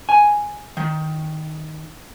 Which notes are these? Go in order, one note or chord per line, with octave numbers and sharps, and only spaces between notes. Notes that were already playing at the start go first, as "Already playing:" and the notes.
G#5
D#3